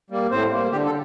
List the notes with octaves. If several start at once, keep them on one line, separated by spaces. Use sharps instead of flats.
G3 A#3
A2 C4 C5
G3 A#3
D3 G4
A4